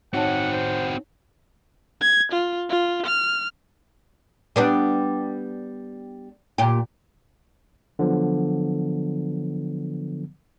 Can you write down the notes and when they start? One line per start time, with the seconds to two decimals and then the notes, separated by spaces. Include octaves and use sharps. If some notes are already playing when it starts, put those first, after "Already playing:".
0.13 C4 D#4 F#4 C#5 F#5 A5
0.52 C5
2.01 G#6
2.33 F4
2.70 F4
3.07 F6
4.56 G3 B3 D4
6.58 A#2 G4
7.99 D3 F3 F#3 B3